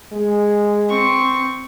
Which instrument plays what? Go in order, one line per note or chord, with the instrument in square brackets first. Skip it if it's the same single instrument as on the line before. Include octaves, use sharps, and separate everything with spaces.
[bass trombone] G#3
[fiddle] C4 C#6